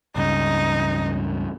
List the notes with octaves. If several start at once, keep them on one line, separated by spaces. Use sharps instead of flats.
C#2 G2 C#3 D#4